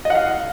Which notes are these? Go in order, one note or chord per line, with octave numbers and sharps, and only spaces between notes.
D#5 F5 F#5